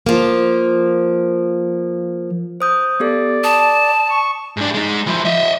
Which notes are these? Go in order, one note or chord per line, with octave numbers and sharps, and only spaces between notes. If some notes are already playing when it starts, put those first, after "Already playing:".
F3 A#3
C5 D#6 G6
B3 G4 A4 D5
A5 D#6
C#6
G#2 D4
G#3 D#4
F3 E4
D#5 E5